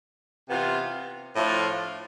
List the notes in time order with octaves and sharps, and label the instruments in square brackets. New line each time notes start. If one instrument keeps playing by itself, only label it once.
[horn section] C3 E3 B3 F4
A2 F3 A3 D4 F4